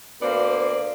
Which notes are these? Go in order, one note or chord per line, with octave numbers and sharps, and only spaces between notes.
D2 A#3 B3 C5 D5